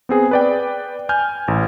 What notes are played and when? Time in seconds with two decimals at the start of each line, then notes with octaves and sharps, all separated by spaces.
0.09 B3 C4 G#4
0.31 B4 D5 G5
1.09 G#5 F6 G6
1.48 A1